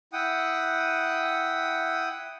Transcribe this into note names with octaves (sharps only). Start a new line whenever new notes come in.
E4 F#5 G5 D#6